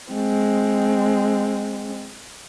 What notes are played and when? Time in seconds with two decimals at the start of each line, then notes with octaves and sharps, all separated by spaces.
0.12 G#3 C4